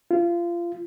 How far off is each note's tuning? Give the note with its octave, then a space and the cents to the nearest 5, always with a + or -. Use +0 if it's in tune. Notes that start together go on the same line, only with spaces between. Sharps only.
F4 -25